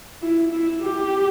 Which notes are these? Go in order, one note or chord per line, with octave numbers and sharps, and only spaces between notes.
E4
E4
G4